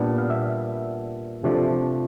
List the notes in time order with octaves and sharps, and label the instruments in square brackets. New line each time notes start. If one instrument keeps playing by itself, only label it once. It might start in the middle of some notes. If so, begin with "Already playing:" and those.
Already playing: [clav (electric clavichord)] A#2 G3 B3 D4
F5
E5
C3 F3 A3 D4